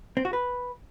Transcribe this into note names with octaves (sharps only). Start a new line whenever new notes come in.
C4
F#4
B4